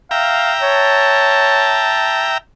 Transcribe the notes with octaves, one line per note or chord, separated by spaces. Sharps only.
E5 F5 G5 A#5
C#5 A5